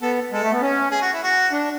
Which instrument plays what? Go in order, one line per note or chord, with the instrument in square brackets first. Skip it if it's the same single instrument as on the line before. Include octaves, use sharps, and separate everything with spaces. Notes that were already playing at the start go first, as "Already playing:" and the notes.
[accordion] B3 [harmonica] A4
[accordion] G#3 [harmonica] A4
[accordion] A3
B3
C#4
[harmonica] G#4
F#4
E4
F#4
[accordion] D4